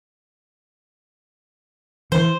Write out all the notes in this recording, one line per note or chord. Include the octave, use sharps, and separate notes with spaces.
E3 C5